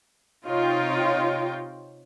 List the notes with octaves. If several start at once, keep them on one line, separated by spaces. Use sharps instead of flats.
C3 D#4 F4 C#5 G5